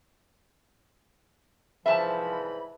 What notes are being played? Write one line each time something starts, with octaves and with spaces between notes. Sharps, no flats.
C2 G#2 E3 F3 E5 A5 B5